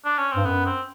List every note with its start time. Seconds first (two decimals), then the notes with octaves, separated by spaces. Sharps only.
0.05 D4
0.18 C#4
0.32 G2 C4
0.45 F#2 B3
0.66 C4